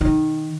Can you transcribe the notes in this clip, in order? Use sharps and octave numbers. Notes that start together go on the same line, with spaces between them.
D#3